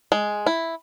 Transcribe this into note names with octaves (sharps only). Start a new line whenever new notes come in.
G#3
E4